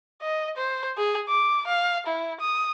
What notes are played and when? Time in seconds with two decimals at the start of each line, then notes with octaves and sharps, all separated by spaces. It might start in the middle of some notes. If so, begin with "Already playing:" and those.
0.22 D#5
0.57 C5
0.98 G#4
1.29 D6
1.67 F5
2.06 E4
2.40 D#6